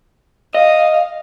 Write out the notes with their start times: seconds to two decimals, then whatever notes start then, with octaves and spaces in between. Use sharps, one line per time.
0.55 D#5 F5